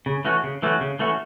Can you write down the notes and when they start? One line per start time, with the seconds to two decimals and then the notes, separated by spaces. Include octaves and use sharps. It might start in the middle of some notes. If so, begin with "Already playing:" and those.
0.06 C#3
0.25 E3 A3 C#4 F#4
0.44 C#3
0.62 E3 A3 C#4 F#4
0.81 C#3
0.99 E3 A3 C#4 F#4